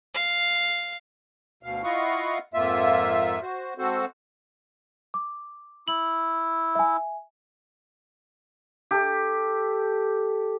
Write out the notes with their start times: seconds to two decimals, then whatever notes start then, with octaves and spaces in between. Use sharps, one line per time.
0.14 F5
1.63 D2 B2 F5
1.83 E4 F4 D#5 F5 F#5 C#6
2.54 F2 G#2 A#3 F4 E5
3.42 F#4 C5
3.78 G#2 C4 F#4 A4 C5
5.14 D6
5.88 E4 F#7
6.75 E5 G#5
8.91 G4 A4